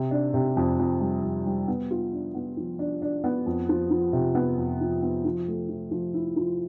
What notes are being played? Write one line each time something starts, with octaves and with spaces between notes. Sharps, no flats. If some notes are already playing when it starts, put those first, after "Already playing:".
Already playing: C3
D4
C3
F2
F2
G3
F2
G3
B3
F4
D4
B3
F3
D4
D4
B3
F2
F3
F3
C3
B3
F2
F3
B3
F3
A3
F3
F3
E4
F3